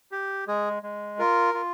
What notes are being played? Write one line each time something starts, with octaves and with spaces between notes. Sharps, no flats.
G4
G#3 G#4
G#3
F4 A#4
F4